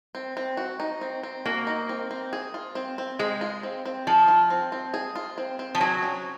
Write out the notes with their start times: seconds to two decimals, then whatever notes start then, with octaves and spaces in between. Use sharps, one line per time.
0.15 C4
0.37 C4
0.57 F#4
0.80 D#4
1.01 C4
1.23 C4
1.45 A#3 F#4
1.67 D#4
1.89 C4
2.11 C4
2.33 G#4
2.54 F4
2.75 C4
2.98 C4
3.19 G#3 G#4
3.41 F4
3.63 C4
3.85 C4
4.07 F3 G#4
4.28 F4
4.50 C4
4.72 C4
4.94 G#4
5.16 F4
5.38 C4
5.59 C4
5.75 F3
5.80 F#3 G#4
6.02 C#4